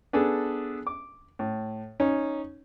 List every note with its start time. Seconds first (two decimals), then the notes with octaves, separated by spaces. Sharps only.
0.13 B3 D4 G#4 A4
0.87 D6
1.39 A2
2.00 C#4 D#4